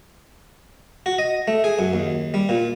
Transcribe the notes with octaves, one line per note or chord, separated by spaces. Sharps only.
F#4
D#5
A3
G#4
F#2
D#2
G3
A#2